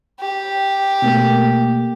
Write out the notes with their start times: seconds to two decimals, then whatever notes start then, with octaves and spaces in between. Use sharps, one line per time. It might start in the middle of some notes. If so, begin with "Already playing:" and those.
0.20 G4
1.02 B2 A3 A#3